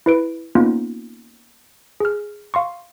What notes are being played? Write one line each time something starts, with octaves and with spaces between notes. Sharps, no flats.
E4 B4 D7
A#3 B3 C#4 D#4 F4
G#4 F6
F5 C6 C#6